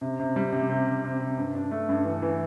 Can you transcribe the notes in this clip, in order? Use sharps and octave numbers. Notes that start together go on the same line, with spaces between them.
C3
C3
G3
C3
C3
C3
C3
C3
G2
D4
A3
G2
E3
E3